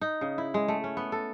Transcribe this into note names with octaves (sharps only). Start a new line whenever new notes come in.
D#4
C#3
E4
G#3
A3
C#4
B3
A4